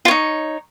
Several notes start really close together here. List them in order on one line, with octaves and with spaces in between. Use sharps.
F4 C#5 D#4